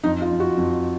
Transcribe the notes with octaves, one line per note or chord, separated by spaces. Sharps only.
F2 D#4
F4
F2
F#4
F2